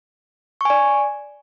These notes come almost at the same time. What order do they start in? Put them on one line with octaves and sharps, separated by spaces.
C#6 G#5 D5